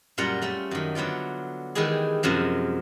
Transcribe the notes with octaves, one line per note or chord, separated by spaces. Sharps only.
F#2 A#2 G3 F4 F#5 A#5
G3 A3 C#4
F#2 D#3
D3 F#3 B3 F4 D5
D#3 E3 G#3 E4 G4 G#4
F#2 C3 F3 G#3